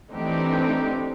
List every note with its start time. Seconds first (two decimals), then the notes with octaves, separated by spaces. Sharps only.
0.10 E3 A3 C4 D4 D#4 G4